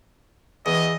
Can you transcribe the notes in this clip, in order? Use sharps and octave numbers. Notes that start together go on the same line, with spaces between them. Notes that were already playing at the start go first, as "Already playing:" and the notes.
E2 D#5